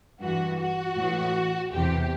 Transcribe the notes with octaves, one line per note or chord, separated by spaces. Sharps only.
G2 E3 F#4
F#4
A2 E3
E2 C3 E3 G4